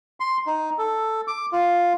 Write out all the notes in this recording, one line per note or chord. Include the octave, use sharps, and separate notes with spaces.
C6
D#4
A4
D6
F4